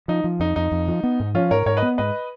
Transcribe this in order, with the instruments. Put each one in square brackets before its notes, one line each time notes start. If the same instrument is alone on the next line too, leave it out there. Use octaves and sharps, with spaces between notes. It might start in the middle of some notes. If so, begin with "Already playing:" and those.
[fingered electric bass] F3 [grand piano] D#4
[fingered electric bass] F3
[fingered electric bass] F2 [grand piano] D#4
[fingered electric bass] F2 [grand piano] D#4
[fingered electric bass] F2
F3
B3
G#2
[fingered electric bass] F3 [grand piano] C#4 F4
[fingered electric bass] G#2 [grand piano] A#4 C#5
[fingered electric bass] G#2 [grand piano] A#4 C#5
[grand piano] B4 D#5
[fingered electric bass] B3
[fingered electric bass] G#2 [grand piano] B4 D#5